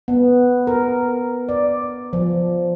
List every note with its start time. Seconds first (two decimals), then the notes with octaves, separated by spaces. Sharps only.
0.08 B3
0.67 A#4
1.49 D5
2.13 F3